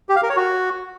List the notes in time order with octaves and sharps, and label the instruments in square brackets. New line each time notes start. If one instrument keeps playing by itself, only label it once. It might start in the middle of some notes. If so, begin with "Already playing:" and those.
[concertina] G4
F5
A#4
C#5
F#4